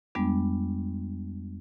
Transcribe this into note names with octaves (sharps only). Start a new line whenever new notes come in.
F2 G3 G#3 B3 D4